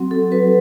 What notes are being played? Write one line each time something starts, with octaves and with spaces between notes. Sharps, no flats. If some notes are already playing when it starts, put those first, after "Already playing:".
Already playing: F#3 C4 F#4
A4
F#3 C4 F#4 B4